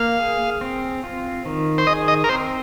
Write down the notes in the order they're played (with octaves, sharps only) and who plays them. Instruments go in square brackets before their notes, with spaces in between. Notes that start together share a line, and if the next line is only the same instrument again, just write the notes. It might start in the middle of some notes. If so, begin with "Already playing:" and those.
Already playing: [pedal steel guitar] A#3 [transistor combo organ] F5
[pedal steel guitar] G#4
C4
F4
D#3
[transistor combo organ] C5
[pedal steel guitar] G#4 [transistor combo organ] D#5
[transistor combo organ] D#5
A#4
[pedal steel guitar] C4 [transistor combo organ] C5